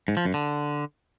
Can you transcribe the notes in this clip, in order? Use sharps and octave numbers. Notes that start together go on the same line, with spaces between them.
G#2
F3
F#2
D3